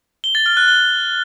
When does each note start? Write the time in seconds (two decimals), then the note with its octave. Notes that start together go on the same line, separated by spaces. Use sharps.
0.24 G7
0.35 A6
0.46 F6
0.57 F#6
0.68 G7